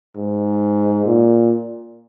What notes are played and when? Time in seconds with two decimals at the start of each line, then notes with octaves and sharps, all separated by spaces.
0.17 G#2
1.06 A#2